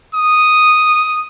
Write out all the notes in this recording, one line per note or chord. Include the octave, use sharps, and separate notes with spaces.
D#6